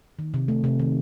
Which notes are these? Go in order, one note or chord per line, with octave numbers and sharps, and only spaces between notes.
D#3
C3
A3
C3
D#3